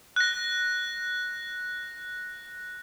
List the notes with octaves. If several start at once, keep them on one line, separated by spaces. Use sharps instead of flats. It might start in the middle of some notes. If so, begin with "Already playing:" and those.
F#6 A#6